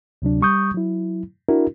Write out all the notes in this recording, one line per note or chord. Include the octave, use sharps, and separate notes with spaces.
D2 C3 F#3 D4
G3 C#6 D#6 G6
F#3 E4
D4 E4 F#4 A#4